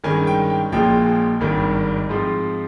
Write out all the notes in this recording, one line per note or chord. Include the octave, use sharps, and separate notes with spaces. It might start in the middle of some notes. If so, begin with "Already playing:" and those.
G2 D#3 G#3 C#4 G#5
G5
G5
A#1 A#2 F3 G#3 G5
G#1 G2 D#3 G3
G#2 F3 C4